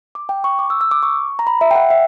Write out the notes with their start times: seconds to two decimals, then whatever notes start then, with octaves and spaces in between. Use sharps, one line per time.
0.15 D6
0.29 G5
0.44 C#6
0.59 D6
0.70 E6
0.81 E6
0.91 D6
1.03 C#6
1.39 A#5
1.47 B5
1.61 E5
1.71 G5
1.75 F#5
1.90 E5